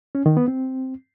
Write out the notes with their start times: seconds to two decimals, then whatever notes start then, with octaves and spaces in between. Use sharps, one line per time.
0.15 C#4
0.26 D#3
0.37 B3
0.48 C4